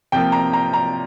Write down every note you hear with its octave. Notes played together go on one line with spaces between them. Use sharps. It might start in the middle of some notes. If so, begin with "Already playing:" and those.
C3 F3 A#3 G5
A#5
A#5
A#5